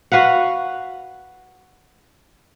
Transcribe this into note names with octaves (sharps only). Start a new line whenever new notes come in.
F#4 B4 F5 F#5